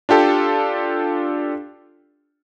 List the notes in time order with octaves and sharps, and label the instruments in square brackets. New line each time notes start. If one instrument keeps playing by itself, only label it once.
[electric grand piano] D4 F4 G4 A4